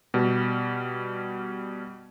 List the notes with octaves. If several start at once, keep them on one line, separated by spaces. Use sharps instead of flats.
B2 G3